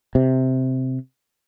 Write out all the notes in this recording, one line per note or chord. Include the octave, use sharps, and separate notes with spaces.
C3